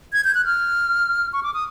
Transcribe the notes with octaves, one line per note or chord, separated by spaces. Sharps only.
G#6
G6
F#6
F6
C#6
D6
D#6